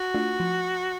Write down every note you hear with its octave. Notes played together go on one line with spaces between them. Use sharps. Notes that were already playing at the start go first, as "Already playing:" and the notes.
Already playing: F#4
A3 D4 F4
F3